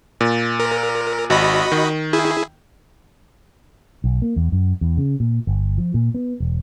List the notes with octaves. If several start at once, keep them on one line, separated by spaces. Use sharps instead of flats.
A#2
A#4
G#1 F#4 D#5 B5
D#3
E4 G#4
B1
A#3
E2
F#2
E2
C#3
A#2
G1
F3
A#2
B3
E1